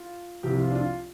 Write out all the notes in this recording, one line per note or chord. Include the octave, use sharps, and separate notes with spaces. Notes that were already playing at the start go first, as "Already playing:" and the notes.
Already playing: F4
C2 C3 F3 G4
F4
D4
F4